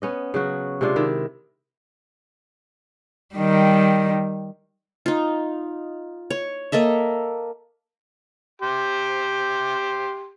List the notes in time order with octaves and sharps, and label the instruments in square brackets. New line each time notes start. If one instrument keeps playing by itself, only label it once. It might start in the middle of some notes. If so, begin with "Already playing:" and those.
[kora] B3 C#4 D#5
C#3 F#3 F#4
C3 G#3 D4 F4
D#3 E4
[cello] D#3 G3
[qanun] D#4 F4
C#5
A#3 A4 D#5 E5
[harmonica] G4 C6